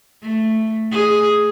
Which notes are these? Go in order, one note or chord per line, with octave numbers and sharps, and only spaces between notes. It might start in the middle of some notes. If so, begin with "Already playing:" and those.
A3
G#4